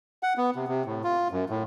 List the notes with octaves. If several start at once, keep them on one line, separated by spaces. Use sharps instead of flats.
F#5
B3
C3
C3
A2
F4
F#2
A2